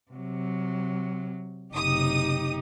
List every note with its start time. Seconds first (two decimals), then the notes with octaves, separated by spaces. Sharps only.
0.12 C3 F#3
1.74 F#1 C3 D#4 G4 D#6